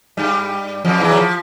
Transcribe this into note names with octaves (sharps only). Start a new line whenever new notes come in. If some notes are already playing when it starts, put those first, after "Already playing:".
G2 G3
F2 F3
E2 E3
F#3
F3